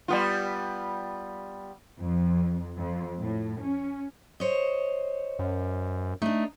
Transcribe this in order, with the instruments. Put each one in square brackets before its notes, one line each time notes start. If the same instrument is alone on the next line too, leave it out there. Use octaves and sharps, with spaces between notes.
[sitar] G3 B3 F4
[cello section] F2
F2
A2
C#4
[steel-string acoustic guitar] C5 C#5 D#5
[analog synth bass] F#2
[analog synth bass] A3 [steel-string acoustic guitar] D4 D#4